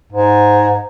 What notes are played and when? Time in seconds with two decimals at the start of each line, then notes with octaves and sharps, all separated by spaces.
0.13 G#2